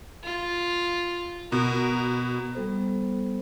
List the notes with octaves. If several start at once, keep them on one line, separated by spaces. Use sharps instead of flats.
F4
B2 A#4
G3 B3 A4 C5